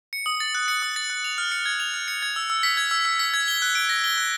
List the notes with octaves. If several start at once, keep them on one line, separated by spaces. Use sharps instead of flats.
C#7
D#6
A6
F#6
C#7
D#6
A6
F#6
F7
F6
C#7
G#6
F7
F6
C#7
G#6
E6
E6
B6
G#6
E6
E6
B6
G#6
G7
F#6
D7
A#6
G7
F#6